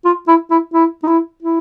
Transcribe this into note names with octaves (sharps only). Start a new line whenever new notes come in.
F4
E4
E4
E4
D#4
E4
E4